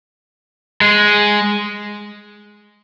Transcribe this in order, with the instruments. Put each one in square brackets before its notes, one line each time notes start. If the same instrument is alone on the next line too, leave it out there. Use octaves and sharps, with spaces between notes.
[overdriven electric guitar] G#3